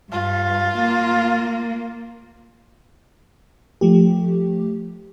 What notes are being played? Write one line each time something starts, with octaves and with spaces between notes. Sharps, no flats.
G2 F4
A#3
F3 A3 G4